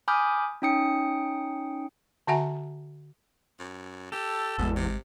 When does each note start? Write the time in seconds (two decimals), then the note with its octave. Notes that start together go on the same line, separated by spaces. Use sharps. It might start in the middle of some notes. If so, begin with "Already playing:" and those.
0.08 G#5 B5 D6 D#6 F6 G6
0.62 C#4 D#4 G5 D#6 C#7
2.27 D3 F#4 E5 F#5 G#5 A#5
3.59 F#2
4.12 G4 A4
4.58 G#1 E2 B2 G#3
4.76 C3